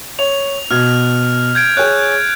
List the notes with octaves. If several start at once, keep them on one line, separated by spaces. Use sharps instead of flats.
C#5 F7
B2 F6 G#6
G6 G#6 D7
G#4 C#5 F#6